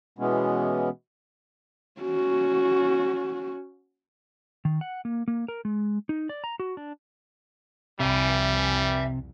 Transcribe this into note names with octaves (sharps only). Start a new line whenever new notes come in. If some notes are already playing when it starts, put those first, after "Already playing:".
B2 E3 G#3 B3 C#4
C#4 F#4
D#3
F#5
A#3
A#3
A#4
G#3
D#4
D5
A#5
F#4
D4
C2 F2 C3 G3 E5 G#5